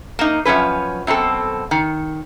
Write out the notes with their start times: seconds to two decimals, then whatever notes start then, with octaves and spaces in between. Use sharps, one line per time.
0.19 A#3 D#4
0.45 F#2 F3 C#4 B4
1.07 F#2 B2 C4 A4
1.71 D#3